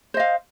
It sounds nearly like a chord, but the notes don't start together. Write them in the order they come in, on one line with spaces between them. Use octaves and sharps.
C5 D#5 F5